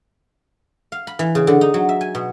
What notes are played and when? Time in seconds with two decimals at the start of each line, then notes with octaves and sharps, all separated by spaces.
0.92 F5
1.07 B5
1.19 E3
1.35 C#3
1.47 D3
1.61 D#4
1.74 F#3
1.89 E5
2.01 G#5
2.15 B2